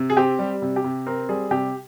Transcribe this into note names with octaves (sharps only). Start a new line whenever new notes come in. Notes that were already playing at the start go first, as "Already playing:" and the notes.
Already playing: C3
G#4
C4 G4
G3
C3
G4
C3
C4 A#4
G3 G#4
C3 G4